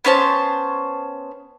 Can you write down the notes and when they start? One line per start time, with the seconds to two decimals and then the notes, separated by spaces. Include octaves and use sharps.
0.05 B3 C#4 C5 A5